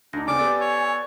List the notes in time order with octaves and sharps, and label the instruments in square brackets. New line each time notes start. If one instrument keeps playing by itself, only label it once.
[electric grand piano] D2 D#4 [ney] D4 [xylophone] A#6
[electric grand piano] C#3 B3 C4 [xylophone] D5 F6 [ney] G#5 [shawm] D6
[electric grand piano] B3 G4 A4 [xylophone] D5 G6
[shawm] C#5